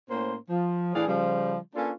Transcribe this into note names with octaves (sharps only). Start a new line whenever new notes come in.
A2 A#3 C#4 C5
F3
A2 E3 D4 G#4 D5 F5
C#3 F3 G3
A#3 C#4 D4 F4 A4 B4